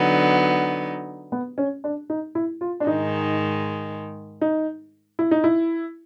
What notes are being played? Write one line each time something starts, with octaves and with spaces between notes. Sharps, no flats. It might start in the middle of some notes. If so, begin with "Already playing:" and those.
Already playing: D3 F#3 B3 D#4
B3
C#4
D4
D#4
E4
F4
D4
G#2 D#3 G#3 D#4
D#4
E4
D#4
E4